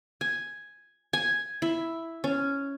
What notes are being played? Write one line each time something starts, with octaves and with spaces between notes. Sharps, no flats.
G#5
G#5
E4
C#4